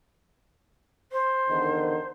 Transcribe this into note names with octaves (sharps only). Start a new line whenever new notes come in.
C5
E2 D3 D#3